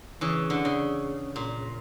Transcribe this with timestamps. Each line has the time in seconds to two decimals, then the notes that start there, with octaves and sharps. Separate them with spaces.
0.21 C#3 E3
0.50 D3
0.65 C#3
1.36 A#2